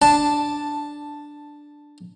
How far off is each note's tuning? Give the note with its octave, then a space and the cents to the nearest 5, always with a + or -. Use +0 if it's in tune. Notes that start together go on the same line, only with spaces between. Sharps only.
D4 +0 A5 +0